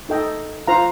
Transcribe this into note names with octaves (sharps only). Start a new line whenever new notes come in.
D#4 A4 D#5 G5
F4 C5 F5 A#5